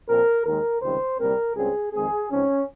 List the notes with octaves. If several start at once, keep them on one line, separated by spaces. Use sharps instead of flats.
A#2 F3 C4 A#4
D#2 D#3 G#3 A#4
C#2 C3 D#3 G3 C5
C2 A#2 G3 C4 A#4
C#2 C#3 G3 C4 G#4
F2 D#3 G#3 C4 G#4
G#2 F3 C4 C#4